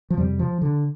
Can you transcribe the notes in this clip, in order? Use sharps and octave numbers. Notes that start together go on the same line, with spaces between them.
F3
F2 C3 G3
F3
D3